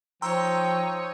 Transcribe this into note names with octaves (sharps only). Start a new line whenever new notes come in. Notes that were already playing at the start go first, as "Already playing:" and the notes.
F3 D#4 C#5 G5 A#5 C6 E6